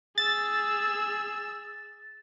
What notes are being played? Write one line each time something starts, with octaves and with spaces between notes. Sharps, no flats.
G#4 E6 A6